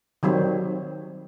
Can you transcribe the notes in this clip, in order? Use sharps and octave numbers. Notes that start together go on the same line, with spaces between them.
D#3 F#3 G3 C4